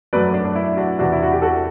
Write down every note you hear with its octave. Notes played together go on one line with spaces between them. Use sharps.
F#2 F#3 A3 B4 D5
D4
D4
E4
D4 F#4
E2 C3 E3 D4 F#4
E4
F#4
G4
F#4 A4